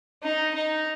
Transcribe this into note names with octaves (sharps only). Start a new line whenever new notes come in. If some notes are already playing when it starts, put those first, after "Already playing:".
D#4
D#4